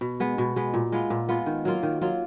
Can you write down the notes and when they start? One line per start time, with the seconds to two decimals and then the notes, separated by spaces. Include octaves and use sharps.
0.01 B2
0.20 G#3 B3
0.38 B2
0.56 G#3 B3
0.74 A#2
0.92 G#3 B3 F4
1.10 A#2
1.28 G#3 B3 F4
1.46 D#3
1.65 F#3 A#3 F4
1.83 D#3
2.01 F#3 A#3 F4